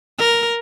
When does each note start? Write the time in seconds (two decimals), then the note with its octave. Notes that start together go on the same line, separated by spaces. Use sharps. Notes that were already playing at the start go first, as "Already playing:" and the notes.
0.19 A#4